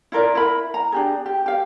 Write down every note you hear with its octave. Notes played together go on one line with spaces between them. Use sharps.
E4 F4 A#4 D5
E4 A#4 B5
A#5
D4 G4 G#4
G4
G4 F5